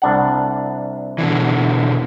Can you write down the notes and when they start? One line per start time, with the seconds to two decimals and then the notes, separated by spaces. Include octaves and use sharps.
0.02 C2 D4 F#5
1.18 B2 D3 E3